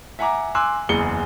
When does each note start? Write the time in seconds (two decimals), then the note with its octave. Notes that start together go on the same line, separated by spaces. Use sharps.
0.19 E5 F#5 G#5 A#5 D6
0.55 G#5 C6 D6 E6 F#6
0.89 F#1 E2 G#4 C#7 G7